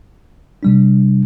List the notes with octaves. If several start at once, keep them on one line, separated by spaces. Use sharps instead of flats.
C3 G3 D4